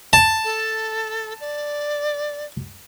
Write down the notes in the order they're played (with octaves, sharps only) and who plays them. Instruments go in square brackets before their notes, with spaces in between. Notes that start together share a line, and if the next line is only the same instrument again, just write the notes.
[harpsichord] A5
[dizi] A4
D5